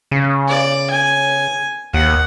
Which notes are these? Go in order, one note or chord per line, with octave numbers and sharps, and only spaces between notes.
C#3
D5
G#5
D#2 F#5